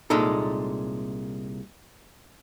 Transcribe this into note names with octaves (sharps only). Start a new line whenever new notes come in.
C2 A#2 G#3 D#4 A4